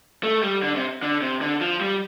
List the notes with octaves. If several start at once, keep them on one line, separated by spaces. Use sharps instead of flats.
A3
G3
D3
C3
D3
C3
D3
F3
G3